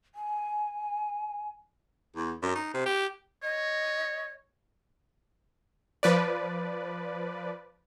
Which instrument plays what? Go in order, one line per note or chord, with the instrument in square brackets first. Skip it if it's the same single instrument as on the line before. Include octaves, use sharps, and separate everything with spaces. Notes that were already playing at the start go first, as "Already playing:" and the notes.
[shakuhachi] G#5
[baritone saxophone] E2
F#2
D#4
C3
G4
[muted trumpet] C#5 [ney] D#5
[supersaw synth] F3 B4 D5